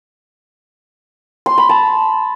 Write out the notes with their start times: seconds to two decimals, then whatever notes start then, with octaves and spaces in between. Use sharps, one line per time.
1.46 C6
1.58 B5
1.69 A5